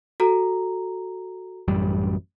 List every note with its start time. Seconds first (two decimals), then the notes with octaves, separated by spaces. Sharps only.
0.20 F#4 A4 A#5
1.68 A1 F#2 G3